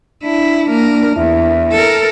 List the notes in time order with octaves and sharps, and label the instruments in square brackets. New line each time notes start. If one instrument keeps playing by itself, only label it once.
[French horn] D4 [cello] E4
[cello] A#3 A#4
[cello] E2 [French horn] E4
[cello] A4 A#4